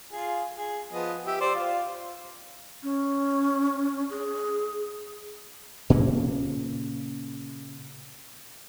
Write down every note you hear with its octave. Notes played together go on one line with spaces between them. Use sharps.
F4 G#4
G#4
F3 B3 D#5
G4 E5
C5 D5
F4
C#4
G#4
A#2 C#3 A#3 C#4